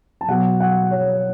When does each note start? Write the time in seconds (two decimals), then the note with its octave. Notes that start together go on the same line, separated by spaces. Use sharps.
0.21 A5
0.28 B2 F#3 F#5
0.60 F#5
0.91 C#5